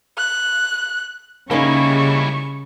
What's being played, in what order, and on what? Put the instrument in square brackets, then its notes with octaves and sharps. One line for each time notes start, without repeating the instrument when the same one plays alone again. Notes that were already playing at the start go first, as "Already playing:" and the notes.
[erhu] F#6
[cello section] C#3 [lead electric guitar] G3 E4 [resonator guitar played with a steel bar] A#3 C#4 D#4 [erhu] C#6